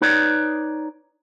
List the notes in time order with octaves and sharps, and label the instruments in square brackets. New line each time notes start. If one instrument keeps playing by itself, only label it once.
[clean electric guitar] D#4 B4 C#5 D5